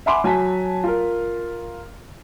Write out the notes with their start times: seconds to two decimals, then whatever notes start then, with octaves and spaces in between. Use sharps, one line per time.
0.06 E5 F#5 G#5 B5 C6 D6
0.24 F#3 G#5 A5 B6
0.84 F4 A#4